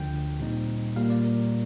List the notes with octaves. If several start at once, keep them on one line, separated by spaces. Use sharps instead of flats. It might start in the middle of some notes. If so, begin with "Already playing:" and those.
Already playing: D2 D3 F3 G5
A#2 G3 C4 D#4
A#2 G3 A#3 F5
D5
A#4